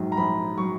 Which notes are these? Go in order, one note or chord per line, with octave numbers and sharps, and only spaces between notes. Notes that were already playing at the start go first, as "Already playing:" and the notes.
Already playing: A#1 G#2 F#3
A#5
A#1 B5
F#3 C#6